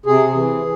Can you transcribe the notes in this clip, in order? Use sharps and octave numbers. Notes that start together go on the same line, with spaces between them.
C3 G#4
E3